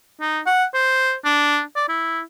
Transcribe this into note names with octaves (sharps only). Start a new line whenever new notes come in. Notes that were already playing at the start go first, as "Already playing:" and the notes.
D#4
F#5
C5
D4
D5
E4